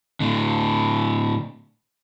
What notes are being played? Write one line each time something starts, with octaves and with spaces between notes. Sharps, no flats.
A2 D3